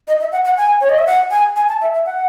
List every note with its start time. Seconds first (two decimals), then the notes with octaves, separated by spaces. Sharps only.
0.07 D#5
0.20 E5
0.32 F#5
0.45 F#5
0.57 G#5
0.81 C#5
0.89 D#5
0.98 E5
1.06 F#5
1.31 G#5
1.56 G#5
1.68 A5
1.81 E5
1.94 E5
2.06 F#5